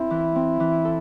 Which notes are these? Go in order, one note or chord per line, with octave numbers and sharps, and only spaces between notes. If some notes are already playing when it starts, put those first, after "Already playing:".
Already playing: C4 E4 A4
E3
C4
E3
A4